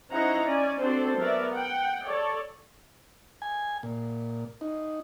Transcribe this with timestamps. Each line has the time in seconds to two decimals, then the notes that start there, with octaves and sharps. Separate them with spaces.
0.11 C#4 D#4 E4 C5 F#5 A#5
0.44 C#4 D5 G#5
0.80 C4 D4 F#4 A4 C5
1.18 F#3 B3 A#4 D5 E5
1.51 F#5 G5
2.04 A4 C#5 D5
3.42 G#5
3.83 A#2
4.61 D#4